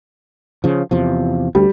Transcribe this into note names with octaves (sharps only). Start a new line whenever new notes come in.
C#3 F3
E2 C3 F3
D2 G3